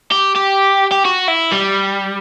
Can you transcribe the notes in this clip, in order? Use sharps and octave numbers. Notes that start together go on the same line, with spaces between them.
G4
G4
G4
F#4
E4
G3